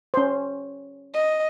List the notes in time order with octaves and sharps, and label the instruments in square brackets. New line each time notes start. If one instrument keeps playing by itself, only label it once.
[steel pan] C#4 C5
[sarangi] D#5